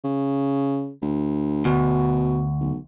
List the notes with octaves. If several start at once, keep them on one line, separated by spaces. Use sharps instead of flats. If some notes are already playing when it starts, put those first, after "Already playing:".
C#3
D2
D2 B2
B1